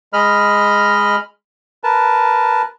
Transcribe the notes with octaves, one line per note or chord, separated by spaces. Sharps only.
G#3 D#5 B5 F6
A#4 B4 A5